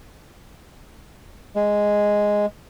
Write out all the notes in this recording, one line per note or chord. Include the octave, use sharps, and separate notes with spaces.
G#3